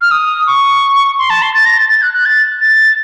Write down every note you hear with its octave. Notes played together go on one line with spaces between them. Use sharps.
F6
D#6
C#6
C6
A5
C6
A6
A#6
A6
A6
F#6
F#6
A6
A6